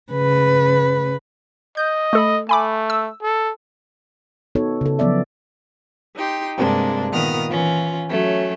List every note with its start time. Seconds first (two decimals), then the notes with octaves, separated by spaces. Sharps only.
0.12 C#3 B4
1.77 D#5 G6
2.13 A3 A4 B5
2.49 A3 G#5 B5 D6
2.90 E6
3.22 A4
4.55 B3 D#4 F#4 A4 C#5
4.81 C#3 A4
4.99 F3 F#3 B3 C#4 D5 E5
6.16 D#4 G4 C6
6.57 G2 C3 G#3 A#3 D4
7.12 A#2 D#3 B3 D#6 F6
7.49 E3 C#4 F4
8.09 F#3 A3 C#4